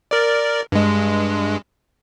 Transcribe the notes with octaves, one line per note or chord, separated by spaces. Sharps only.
A#4 D5
G2 G#3